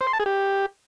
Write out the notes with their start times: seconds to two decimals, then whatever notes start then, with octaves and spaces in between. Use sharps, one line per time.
0.01 C5
0.07 C6
0.13 A5
0.20 G#4
0.26 G4